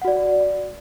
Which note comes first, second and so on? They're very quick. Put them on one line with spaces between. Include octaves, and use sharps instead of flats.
F#5 F#4 D5